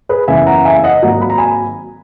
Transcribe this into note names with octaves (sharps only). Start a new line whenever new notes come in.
G#4 B4
F#1 E2 C#3 E3 E5 G#5
F#5 A#5
F#5
E5 G#5
E5
D#5 F#5
G#1 G#2 F#3 A#3 F#5 A#5
B5
A#5
G#5 B5